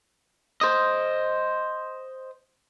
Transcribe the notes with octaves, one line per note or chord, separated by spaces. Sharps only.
C5 D#5